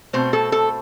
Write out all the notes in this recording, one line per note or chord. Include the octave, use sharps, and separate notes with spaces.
B2 A3 C4 C5
A4
A4